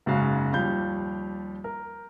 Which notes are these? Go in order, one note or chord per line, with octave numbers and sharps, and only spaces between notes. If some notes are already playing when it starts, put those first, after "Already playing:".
F#1 G#2 C#3 F#4 F5
D#2 F3 G3 F5 G6
A#4